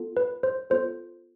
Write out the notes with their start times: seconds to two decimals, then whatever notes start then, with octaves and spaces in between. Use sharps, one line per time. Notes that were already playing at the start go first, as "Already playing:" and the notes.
Already playing: B3 F4 A4
0.17 B4
0.43 C5
0.70 B3 F4 A4 C5